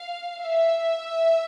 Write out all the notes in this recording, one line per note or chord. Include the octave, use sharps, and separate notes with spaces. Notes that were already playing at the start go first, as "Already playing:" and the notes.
Already playing: F5
E5